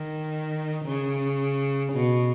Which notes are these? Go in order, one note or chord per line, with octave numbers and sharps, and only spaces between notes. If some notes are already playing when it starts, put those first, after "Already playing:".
Already playing: D#3
C#3
B2